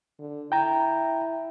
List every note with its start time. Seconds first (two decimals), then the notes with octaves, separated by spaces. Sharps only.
0.19 D3
0.52 E4 G5 A#5